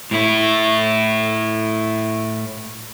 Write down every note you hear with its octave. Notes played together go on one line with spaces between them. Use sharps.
A2 E4